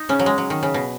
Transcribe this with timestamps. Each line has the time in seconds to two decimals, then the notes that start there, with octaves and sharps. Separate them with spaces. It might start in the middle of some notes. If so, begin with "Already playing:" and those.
Already playing: D#4
0.09 C#3 C#4
0.19 F#3
0.26 G#3
0.38 F#3
0.50 D#3
0.63 C#3
0.74 B2